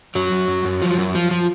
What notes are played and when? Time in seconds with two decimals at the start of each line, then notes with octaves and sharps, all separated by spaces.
0.15 F#2 F#3
0.32 F#2
0.48 F#2
0.65 F#2
0.82 F3
0.98 F#2
1.15 F3
1.31 F3